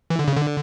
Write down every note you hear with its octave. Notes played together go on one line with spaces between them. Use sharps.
E3
D3
C#3
D3